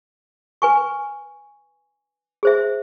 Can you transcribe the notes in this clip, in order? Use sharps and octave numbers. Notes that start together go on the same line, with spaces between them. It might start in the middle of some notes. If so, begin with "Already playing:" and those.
B4 G#5 C#6
G#4 C5 E5